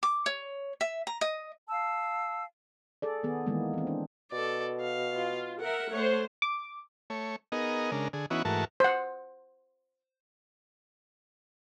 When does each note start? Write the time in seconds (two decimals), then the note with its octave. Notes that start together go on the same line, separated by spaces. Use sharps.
0.03 D6
0.26 C#5
0.81 E5
1.07 A#5
1.21 D#5
1.68 F5 A5 E6
3.02 G#4 A4 D5
3.23 D#3 B3 G#4
3.46 D#3 E3 G#3 A#3 B3
3.73 E3 C4
3.87 D4
4.32 B2 A4 D5
4.81 F5
5.14 F4
5.61 A#4 E5 F#5
5.92 A3 C5 C#5 F#5
6.42 D6
7.10 A3 C#5
7.52 B3 D#4 G#4 A#4 D#5
7.92 C#3 G#3 D4 A#4
8.13 D3 G#4
8.30 E3 B3 C#4 D#4 E4 F#4
8.45 G#2 E3 A3 F#4 A#4 A5
8.80 C5 F#5